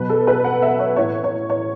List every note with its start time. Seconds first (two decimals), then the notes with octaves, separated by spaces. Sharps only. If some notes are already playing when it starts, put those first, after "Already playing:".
Already playing: B2 F#3 B4
0.09 A4
0.27 B4
0.44 F#5
0.62 E5
0.79 C#5
0.96 A2 E3 C#5
1.24 C#5
1.50 C#5